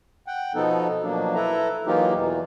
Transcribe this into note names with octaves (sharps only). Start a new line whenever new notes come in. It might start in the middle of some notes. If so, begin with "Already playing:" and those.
F#5 G5
B2 F3 B3 D#4 A4
B2 F3 F#3 A#3 D4
E4 A4 B4 E5 A#5
E3 F#3 A#3 D#4 F4 G4
E2 B2 E3